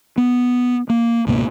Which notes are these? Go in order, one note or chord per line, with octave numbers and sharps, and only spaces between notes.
B3
A#3
C#2 G#2 B2 A#3